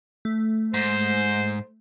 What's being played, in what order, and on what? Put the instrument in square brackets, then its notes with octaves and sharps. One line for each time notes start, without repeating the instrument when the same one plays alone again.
[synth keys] A3
[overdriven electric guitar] G#2 [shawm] C5